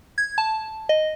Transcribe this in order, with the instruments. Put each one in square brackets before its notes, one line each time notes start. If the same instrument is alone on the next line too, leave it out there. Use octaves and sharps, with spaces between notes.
[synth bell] G#6
A5
D#5